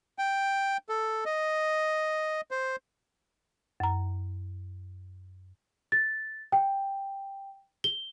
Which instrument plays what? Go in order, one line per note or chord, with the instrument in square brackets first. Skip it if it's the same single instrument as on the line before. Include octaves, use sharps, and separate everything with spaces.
[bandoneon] G5
A4
D#5
C5
[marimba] F#2 A#5
[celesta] A6
G5
G7